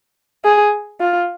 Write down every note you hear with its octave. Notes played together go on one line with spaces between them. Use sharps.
G#4
F4